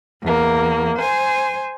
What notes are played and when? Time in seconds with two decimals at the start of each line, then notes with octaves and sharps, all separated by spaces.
0.23 E2 A#3
0.98 C5 G#5